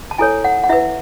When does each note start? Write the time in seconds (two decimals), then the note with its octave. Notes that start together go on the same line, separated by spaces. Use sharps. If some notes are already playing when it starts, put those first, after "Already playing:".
0.11 A5
0.18 E4 A4 C#5 G#5
0.45 F#5
0.64 F#5
0.69 E4 B4 E5